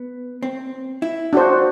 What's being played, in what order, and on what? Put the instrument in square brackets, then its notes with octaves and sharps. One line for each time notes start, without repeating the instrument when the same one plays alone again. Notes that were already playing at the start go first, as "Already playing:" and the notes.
Already playing: [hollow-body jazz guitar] B3
C4
E4
[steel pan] D4 F#4 C5